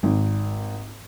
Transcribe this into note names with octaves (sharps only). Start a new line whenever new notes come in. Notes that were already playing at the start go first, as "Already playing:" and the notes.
G#1